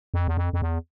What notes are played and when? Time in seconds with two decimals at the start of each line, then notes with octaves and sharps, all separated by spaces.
0.14 F2
0.28 E2
0.37 F2
0.53 F2
0.62 E2